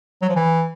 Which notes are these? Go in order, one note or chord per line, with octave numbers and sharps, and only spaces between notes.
F#3
F3
E3